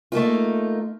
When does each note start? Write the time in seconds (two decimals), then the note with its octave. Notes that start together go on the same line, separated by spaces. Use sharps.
0.12 A3 A#3 D#4 F4